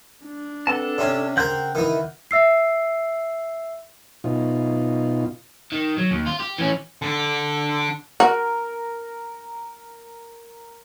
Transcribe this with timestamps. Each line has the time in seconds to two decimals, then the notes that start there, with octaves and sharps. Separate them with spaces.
0.24 D4
0.67 C4 A4 B4 F#5 A5
0.98 C3 C#4 D5
1.37 C#3 C4 A#4 F#5 G6
1.75 D#3 E3
2.31 E5 E6 C7
4.24 B2 D#4 F4
5.72 D#3
5.98 F#3
6.11 D#2
6.26 F4
6.40 G4
6.58 E3 C#4
7.02 D3 D4
8.20 F#4 A#4